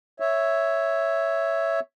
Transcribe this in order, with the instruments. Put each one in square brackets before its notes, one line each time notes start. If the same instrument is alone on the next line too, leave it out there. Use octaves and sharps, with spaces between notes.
[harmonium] C#5 E5